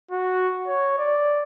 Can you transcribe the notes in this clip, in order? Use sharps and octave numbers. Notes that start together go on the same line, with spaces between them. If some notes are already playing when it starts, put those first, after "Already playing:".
F#4
C#5
D5